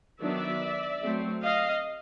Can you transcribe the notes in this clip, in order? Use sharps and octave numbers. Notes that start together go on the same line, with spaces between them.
D#3 F#3 B3 D4 D5 E5
F#3 A3 C4
D#5 F5